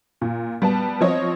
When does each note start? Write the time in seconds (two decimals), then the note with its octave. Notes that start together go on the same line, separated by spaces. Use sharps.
0.21 A#2
0.62 G3 B3 A5
1.01 F3 C4 F4 C#5 D#5